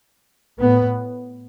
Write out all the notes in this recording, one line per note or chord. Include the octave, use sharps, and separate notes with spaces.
A2 B3